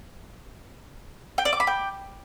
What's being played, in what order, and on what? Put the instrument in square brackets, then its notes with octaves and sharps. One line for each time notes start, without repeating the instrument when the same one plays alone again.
[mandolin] G5
D5
D6
B5
G5